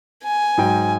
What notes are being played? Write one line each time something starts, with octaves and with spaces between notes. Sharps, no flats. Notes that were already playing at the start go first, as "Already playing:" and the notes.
G#5
G#2 F#3 G5